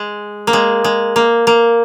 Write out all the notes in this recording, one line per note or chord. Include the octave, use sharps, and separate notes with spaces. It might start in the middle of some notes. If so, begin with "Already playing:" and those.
Already playing: G#3
A#3
G#3
G#3
A#3
A#3